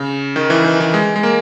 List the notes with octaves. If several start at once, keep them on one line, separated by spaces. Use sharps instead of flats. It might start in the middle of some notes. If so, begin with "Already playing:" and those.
Already playing: C#3
D#3
E3
D#3
E3
G#3
G#3
A#3